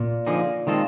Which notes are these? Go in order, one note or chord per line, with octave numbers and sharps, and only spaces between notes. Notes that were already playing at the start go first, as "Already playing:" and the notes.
Already playing: A#2
D3 F3 A#3 D#4 G#4
D#3 G#3 C4 F4 A4